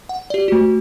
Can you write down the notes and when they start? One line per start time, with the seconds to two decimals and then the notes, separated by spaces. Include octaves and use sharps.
0.09 F#5
0.30 G4 D5
0.48 A3 F#4